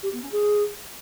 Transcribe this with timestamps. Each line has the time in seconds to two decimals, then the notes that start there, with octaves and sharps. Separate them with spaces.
0.03 G4
0.12 B3
0.22 C#4
0.32 G#4